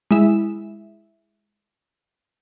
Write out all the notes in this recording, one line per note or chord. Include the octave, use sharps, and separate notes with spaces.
G#3 E4 E5